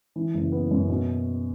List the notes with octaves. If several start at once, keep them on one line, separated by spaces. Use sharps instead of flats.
E3
F#1
B3
F#2
B2